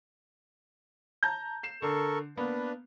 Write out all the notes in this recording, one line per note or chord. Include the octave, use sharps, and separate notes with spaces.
A5 A#5 G6
C7 E7
D3 A4 A#4 C#6
A#3 B3 D4 B4